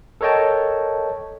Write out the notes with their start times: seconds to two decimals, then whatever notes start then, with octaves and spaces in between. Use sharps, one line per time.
0.21 A4 A#4 C#5 D#5 G5 A5